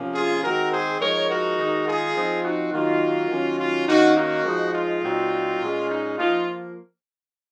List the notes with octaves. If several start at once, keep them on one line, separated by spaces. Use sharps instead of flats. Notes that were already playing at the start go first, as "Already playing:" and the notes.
Already playing: C3 F3 A#3 C#4
F4 G#4
D#3 G#3 C4 F#4 A#4
G#4 C5
F3 G#3 D#4 A#4 C#5
F#4 A#4
D#3 G#3 D#4
F4 G#4
F3 C4 D#4
D#4 F#4
D#3 F#3 A#3 D#4 F4
D#3 F#3 A#3 C#4
F4
D#3 A#3 C#4 D#4 F#4
D#4 F#4
F3 G#3 D#4
F4
A#2 F#3 C4 D#4
A#2 G#3 C#4
D#4
F3 A#3 D#4 F4